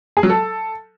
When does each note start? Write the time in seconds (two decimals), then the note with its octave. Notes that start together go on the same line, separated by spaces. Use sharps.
0.17 G#4
0.23 F#3
0.30 A4